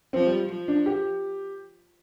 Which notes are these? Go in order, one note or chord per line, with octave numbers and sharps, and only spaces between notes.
F3 C4
G3
F3
D4
G4